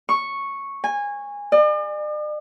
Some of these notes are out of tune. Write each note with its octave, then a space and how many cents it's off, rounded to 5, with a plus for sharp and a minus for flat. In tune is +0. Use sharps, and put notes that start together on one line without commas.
C#6 -5
G#5 -20
D5 +45